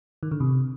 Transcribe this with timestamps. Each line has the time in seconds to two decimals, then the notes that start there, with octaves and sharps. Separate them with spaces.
0.23 D#3
0.31 D3
0.40 C3